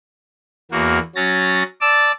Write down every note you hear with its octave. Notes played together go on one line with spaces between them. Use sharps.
E2 A#3 F#4
F#3 C#4 A6 A#6
D5 A5 D6 E6